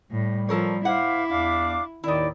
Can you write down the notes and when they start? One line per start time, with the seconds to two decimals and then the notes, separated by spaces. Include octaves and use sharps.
0.11 A2 G3
0.49 F3 A4 A#4 C#5
0.85 E4 C5 F5 F#5 D6
1.29 E2 D4 F5 D6
2.04 D#2 A2 D#3 D#4 E4 D5